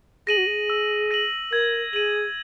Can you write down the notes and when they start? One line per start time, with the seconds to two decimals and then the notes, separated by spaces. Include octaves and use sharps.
0.27 G#4 A#6 D#7 F#7
0.37 F#4
0.47 G#4
0.70 E6
1.11 A#6 D#7 F#7
1.52 A#4 G#6
1.93 G#4 D#7 F#7